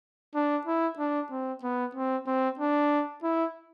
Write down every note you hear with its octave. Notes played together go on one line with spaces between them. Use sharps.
D4
E4
D4
C4
B3
C4
C4
D4
E4